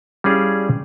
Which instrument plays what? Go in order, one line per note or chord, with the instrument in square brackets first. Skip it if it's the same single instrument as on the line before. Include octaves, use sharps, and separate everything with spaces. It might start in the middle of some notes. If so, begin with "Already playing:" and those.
[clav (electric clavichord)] G3 C#4 E4 G#4 D5 F5